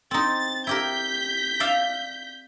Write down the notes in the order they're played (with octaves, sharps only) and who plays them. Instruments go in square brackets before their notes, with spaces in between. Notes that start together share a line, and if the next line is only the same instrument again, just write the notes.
[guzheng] C4 D#4 [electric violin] A6
[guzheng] E4 G4 A#4 [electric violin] G6 B6
[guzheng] D5 E5 F5